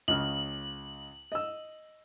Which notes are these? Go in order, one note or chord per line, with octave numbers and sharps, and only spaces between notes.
C#2 C#3 F6 F#7
D#5 E6